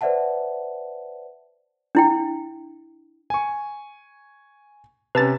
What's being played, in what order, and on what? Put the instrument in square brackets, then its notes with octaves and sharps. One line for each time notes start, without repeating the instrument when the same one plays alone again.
[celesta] B4 C5 D5 E5 F#5 A5
[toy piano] D4 E4 G5
[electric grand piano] G#5 C#6
[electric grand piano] C3 C#4 [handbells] B4 A5 A6